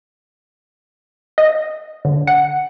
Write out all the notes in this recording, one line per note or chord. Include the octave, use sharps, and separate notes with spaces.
D#5
D3
F#5